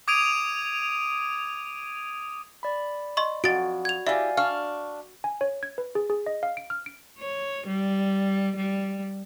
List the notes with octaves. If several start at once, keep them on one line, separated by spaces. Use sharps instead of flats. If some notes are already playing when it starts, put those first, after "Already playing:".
D6 D#6 G#6 D7 D#7 F7
D5 B5
D#5 C6 C#6
F2 F#4 A6 D7
G#6 F7
E4 G4 D5 E5 F5 G#5
D4 F5 C#6 F6
G#5
C#5
G#6
B4
G#4
G#4
D#5
F5
D7
F6
D7
C#5
G3
G3